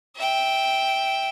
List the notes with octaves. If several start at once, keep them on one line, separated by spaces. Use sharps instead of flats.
E5 G5